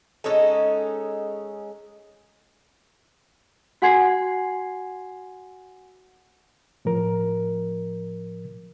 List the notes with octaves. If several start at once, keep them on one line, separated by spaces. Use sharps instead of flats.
G#3 C#4 D#4 A4
F#4 F#5 G#5 C6 G#6 C7
A2 F3 A#4